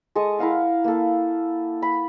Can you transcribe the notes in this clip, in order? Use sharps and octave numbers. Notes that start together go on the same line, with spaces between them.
G#3 A4 C#6 D#6
E4 A#4 F5 F#5
A#3 A4
B5